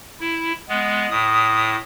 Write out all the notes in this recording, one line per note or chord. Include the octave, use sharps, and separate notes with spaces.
E4
G#3 B3
A2 D#6